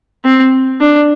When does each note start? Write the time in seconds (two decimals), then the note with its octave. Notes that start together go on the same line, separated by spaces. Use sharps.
0.24 C4
0.80 D4